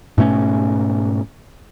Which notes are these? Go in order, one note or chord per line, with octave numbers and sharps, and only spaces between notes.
G#2 B2 A3 C#4